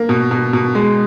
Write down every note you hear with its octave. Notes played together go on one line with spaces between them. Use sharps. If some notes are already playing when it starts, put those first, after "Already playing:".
Already playing: A#3
B2
B2
B2
G#3